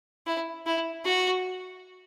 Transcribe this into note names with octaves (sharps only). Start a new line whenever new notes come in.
E4
E4
F#4